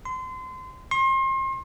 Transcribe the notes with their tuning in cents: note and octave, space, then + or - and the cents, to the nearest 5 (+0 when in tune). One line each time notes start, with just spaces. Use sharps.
C6 -30
C6 +35